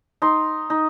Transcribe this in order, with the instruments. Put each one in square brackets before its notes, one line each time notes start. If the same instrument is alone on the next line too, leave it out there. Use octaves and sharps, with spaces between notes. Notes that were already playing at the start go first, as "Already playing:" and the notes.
[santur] D#4 C6
D#4